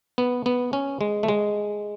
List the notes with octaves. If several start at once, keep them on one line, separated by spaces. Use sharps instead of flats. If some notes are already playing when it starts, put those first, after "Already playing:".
B3
B3
C#4
G#3
A3
G#3